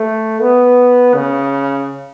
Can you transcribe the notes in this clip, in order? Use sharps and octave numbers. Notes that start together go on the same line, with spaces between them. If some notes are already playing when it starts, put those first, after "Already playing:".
Already playing: A3
B3
C#3